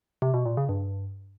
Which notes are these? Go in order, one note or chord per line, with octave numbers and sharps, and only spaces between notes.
C3
B2
A#2
C#3
G2